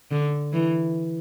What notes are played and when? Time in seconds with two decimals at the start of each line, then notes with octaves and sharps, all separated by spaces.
0.11 D3
0.53 E3